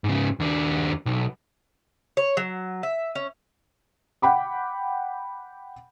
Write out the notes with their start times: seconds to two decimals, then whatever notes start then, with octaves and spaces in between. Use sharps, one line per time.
0.04 G#2 C#3
0.40 D#2 D4
1.06 B1
2.17 C#5
2.37 F#3
2.83 E5
3.15 C#4
4.22 F#5 G5 B5 D6